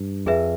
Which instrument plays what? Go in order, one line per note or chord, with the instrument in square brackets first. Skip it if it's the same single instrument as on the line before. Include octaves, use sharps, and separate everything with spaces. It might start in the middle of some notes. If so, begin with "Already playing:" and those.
Already playing: [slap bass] G2
[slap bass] F2 [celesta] G#4 B4 E5